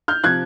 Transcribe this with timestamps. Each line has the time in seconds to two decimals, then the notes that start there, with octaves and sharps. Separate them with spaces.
0.08 F6 G6
0.24 C3 F3 F#6 G#6